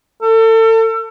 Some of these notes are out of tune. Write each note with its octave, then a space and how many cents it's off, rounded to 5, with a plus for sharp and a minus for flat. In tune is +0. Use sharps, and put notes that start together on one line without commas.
A4 +35